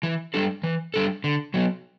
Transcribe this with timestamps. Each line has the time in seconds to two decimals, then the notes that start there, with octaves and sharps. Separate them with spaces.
0.03 E3
0.34 G3 D4 A4
0.64 E3
0.94 G3 D4 A4
1.24 D3
1.54 F#3 B3